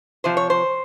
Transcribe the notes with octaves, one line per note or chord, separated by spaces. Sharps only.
C3 F3 C5
C#5
C5